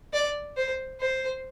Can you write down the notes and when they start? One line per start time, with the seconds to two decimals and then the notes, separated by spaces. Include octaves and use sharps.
0.13 D5
0.57 C5
1.01 C5